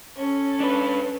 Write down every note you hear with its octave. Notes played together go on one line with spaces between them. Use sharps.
C#4 A4
D4 B4